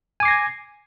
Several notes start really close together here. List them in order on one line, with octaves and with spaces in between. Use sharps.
G#5 D6 C7 A#6 G#6